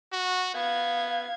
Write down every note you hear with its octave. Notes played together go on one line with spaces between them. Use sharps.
F#4
B3 F5 G#6